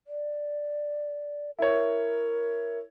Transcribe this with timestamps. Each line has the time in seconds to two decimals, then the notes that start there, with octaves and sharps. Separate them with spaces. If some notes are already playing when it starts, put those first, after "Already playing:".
0.07 D5
1.59 E4 A#4 C#5